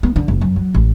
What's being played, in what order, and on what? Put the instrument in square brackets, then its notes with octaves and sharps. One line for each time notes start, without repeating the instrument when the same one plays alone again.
[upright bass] B3
D3
F#1
F#2
F#3
A1